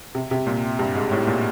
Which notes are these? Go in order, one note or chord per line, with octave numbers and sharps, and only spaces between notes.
C3
C3
A#2
G2
G#2
A2
A#2